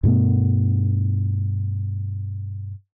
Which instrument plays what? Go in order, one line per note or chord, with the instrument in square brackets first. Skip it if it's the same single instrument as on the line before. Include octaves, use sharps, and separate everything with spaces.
[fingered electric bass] G2 B2 A3 B3